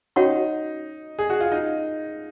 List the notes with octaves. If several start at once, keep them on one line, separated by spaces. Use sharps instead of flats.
C#4 D#4 F#4 C#5 F#5 C#6
G#4
F#4
F4
D#4